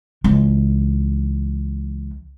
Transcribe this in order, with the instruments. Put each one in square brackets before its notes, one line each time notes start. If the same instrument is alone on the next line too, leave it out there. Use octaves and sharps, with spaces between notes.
[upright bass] C#2 E3